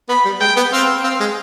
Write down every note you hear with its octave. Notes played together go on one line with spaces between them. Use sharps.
B3 B5
G3
G#3 G5
B3
C4 F5
C4 F5
G#3